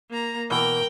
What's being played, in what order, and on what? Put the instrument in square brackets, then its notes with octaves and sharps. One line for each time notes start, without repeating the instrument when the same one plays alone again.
[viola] A#3 A#5
[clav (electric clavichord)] B2 E3 A#3 [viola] A#4 G5